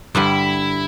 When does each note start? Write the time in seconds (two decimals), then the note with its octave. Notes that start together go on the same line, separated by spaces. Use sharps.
0.15 G2 D3 G3 E4